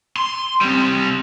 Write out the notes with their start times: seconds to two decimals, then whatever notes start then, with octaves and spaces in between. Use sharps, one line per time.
0.17 C6
0.61 G3 C4